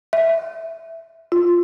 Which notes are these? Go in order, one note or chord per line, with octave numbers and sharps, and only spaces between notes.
E5
F4